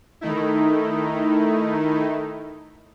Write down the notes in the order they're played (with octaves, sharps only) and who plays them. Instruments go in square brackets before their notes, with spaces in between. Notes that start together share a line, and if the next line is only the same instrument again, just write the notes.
[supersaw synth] D#3 A3 D#4 E4